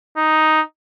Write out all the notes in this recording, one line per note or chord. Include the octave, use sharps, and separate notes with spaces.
D#4